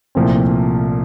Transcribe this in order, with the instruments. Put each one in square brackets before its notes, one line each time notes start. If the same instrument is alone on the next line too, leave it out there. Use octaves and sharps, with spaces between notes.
[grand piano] C2 A#2 F3 A3 C4